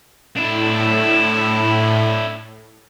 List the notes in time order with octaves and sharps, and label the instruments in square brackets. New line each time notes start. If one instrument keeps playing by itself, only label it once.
[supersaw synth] A2 [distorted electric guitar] D4 E4